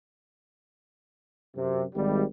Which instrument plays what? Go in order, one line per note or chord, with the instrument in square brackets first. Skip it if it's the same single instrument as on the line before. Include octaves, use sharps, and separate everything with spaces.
[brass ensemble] F#2 C3
G#1 G3